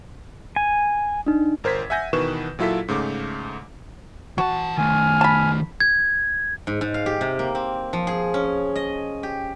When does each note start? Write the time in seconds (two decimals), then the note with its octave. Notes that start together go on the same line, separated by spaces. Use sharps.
0.56 G#5
1.26 D4 D#4
1.64 G1 A#4 C5 G#6 B6
1.90 E5 F#5 G#5 G6 A#6
2.13 B2 D#3 E3 B4 C#6 E7
2.59 A#2 F#3 E4 F4 A4 B6
2.88 G#2 C#3 A3 D6
4.38 E3 F#4 A5
4.78 D#3 A3 G#5 F6
5.21 A5 B5
5.80 G#6
6.67 G#2
6.81 G#2
6.94 F5
7.06 G4
7.21 C3
7.39 A#3
7.55 C4
7.93 F3
8.07 G#4
8.34 C#4
8.75 D#5
9.23 G4